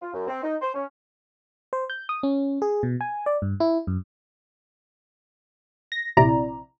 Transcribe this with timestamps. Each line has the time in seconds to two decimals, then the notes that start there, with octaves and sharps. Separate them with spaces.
0.02 F4
0.14 F#2
0.27 C4
0.43 D#4
0.61 C5
0.74 C#4
1.73 C5
1.90 G6
2.09 D#6
2.23 C#4
2.62 G#4
2.83 B2
3.01 G#5
3.26 D5
3.42 G2
3.60 E4
3.87 F#2
5.92 A#6
6.17 A#1 C3 E4 D5 A#5